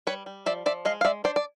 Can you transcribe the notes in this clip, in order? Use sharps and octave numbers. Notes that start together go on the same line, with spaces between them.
G3 B4 C#5
G3
F3 D5 E5
F3 D5 E5
G#3 D#5 F5
F5
G#3 D5 E5
D4 C5 D5
D5